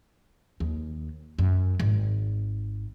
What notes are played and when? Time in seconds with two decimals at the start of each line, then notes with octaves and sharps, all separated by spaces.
0.60 D#2
1.39 F#2
1.80 G#1